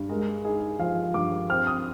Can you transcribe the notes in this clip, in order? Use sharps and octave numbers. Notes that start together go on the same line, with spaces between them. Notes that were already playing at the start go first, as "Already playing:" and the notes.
Already playing: G2
G#3 A#4
D#4 G#4
F3 F5
G2 D6
C4 F6
D#6